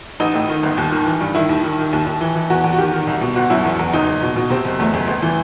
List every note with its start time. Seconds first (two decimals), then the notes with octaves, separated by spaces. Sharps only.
0.20 A1 D#4
0.34 A2
0.49 D#3
0.63 G1
0.78 D#2
0.92 D#3
1.06 E3
1.21 G2
1.35 D#3 E4
1.49 D#2
1.63 D#3
1.78 D#3
1.93 D#2
2.07 D#2
2.21 E3
2.35 E3
2.50 E2 F#4
2.64 E2
2.73 F#4
2.78 D#3 G4
2.93 D#3
3.07 C2
3.21 B2
3.36 G1 F#4
3.50 F#2 E4
3.64 E2
3.79 E2
3.93 F#1 D#4
4.07 F#1
4.22 B2
4.36 B2
4.50 C3 C4
4.65 F#1
4.79 E2 A3
4.94 F#1
5.08 G1
5.22 E3